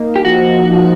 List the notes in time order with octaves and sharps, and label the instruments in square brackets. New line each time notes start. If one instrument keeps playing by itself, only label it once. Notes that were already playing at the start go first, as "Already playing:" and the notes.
Already playing: [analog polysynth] A#3 D#4
[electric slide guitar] G4
[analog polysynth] F3 [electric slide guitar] F#4
[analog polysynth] F3